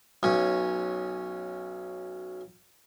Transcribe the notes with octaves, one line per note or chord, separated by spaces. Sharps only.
B1 C#4